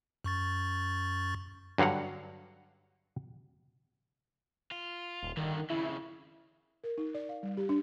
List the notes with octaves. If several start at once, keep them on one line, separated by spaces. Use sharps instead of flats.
F#2 C#6 A6
G2 D3 F#3 F5 F#5
F4
D#1
G2 D3 D#3
F2 C#3 E4
A#4
D#4
D5
F5
G3
G4
D4